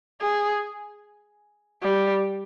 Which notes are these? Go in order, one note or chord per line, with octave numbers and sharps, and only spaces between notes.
G#4
G3